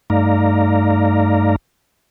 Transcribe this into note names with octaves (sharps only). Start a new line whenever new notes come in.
G2 A3 D#4 D5 F5 A#5